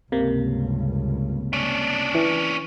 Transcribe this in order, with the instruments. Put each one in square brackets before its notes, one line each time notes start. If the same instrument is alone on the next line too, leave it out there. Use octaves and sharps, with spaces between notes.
[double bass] C#2 G2 [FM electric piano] C3 A#3
[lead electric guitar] C#4 D4
[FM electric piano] E3